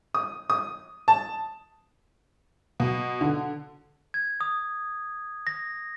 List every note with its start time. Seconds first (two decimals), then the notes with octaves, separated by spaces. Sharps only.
0.14 D#6
0.50 D#6
1.08 A5
2.80 B2
3.21 D3
4.14 G#6
4.41 D#6
5.47 A#6